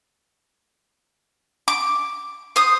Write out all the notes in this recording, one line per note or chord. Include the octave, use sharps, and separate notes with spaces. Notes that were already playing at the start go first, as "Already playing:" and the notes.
D6
C5 D#6